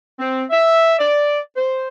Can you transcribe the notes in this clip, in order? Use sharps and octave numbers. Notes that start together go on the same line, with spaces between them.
C4
E5
D5
C5